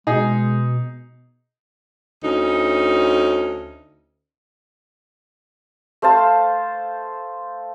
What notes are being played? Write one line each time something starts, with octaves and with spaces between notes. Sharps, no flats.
B2 G#3 D#4 G#4
D2 C#4 D#4
A3 C5 F5 A5